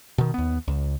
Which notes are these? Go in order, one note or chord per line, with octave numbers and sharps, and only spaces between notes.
B2 D#3
D#2 B3
C#2